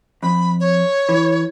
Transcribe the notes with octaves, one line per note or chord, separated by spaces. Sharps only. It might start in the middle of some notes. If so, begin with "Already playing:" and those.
F2 B5
C#5
E3